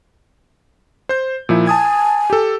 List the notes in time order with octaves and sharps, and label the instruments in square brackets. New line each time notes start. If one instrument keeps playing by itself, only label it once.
[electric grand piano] C5 G6
A#2 F3 E4
[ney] G#5 [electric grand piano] A5 D#6 G#6
[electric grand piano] G4 A4